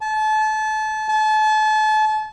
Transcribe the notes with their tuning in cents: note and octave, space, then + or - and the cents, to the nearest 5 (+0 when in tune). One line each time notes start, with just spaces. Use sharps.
A5 -30
A5 -35